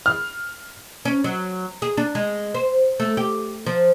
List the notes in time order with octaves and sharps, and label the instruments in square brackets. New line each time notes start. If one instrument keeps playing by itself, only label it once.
[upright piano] F6
[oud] C#4
F#3
G#4
D4
G#3
C5
A3
G4
F3